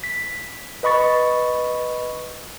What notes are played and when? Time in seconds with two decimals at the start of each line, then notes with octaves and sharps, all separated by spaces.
0.04 B6
0.83 B4 D#5 B5 C#6 A6